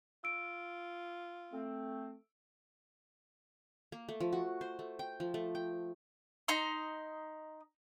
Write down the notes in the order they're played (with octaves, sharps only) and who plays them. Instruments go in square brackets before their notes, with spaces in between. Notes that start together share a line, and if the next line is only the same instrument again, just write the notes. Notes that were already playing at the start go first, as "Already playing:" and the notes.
[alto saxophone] F4 [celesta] E6 D7
[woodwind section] A3 C4
[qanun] A#3
A3
F3
F#4
C5
A3
G5
F3
A3
G5
[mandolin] D#4 A#5 C6